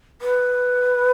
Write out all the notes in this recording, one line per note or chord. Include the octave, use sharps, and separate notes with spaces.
B4